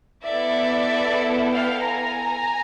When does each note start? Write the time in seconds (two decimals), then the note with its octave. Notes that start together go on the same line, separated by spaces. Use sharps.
0.23 B3 E4 A4 D5 E5
1.50 F5 G5
1.82 G#5 A#5